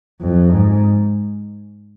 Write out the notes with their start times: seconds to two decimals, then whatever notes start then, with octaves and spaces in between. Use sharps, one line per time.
0.21 F2
0.52 G#2